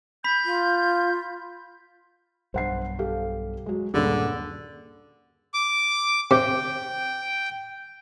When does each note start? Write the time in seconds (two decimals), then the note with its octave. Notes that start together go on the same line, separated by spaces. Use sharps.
0.24 B5 G6 B6
0.45 F4
2.54 B1 G2 C5 F#5 C7
2.99 G4 A4 F5
3.66 F#3 G#3
3.94 D#1 G2 D3 C#4 G#4
5.54 D6
6.31 C3 G5